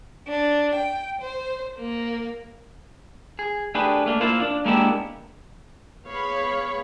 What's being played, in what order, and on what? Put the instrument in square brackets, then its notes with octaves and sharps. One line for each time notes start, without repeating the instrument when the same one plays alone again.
[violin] D4
G5
C5
A#3
[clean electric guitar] G#4
A3 D4 G4 G#4 B4
A3 A#3 D4
A#3 E4 F4 C5
D4
G#3 A#3 B3 D4 E4 G4
[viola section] B3 G#4 C#5 F5 B5